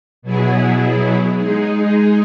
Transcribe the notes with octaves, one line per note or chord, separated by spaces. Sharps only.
B2 F#3 B3 E4 G#4
G#3 D#4 G#4